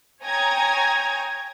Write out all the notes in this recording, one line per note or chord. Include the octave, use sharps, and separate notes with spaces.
C#5 G5 G#5 A#5 D#6 G#6